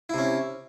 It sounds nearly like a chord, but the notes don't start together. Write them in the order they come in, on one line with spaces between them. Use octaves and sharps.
E4 C3 C#4